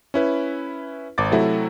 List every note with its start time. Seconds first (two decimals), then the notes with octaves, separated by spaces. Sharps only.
0.14 C#4 E4 B4
1.18 G#1 D6 A6
1.31 C3 F#3 A3 E4 F#4